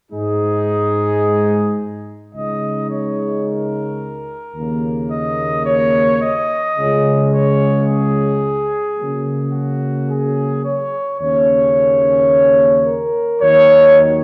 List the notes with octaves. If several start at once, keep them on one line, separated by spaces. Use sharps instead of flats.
G#2 G#3 D#4 G#4
C#2 C#3 G#3 D#4 D#5
C#5
A#4
D#2 C#3 A#3
D#5
C#5
D#5
C#2 C#3 G#3 C#4
C#5
G#4
C#3 F#3 A#3
F#4
G#4
C#5
D#2 C#3 A#3 C#4 C#5
A#4
D#2 D#3 F#3 D#4 C#5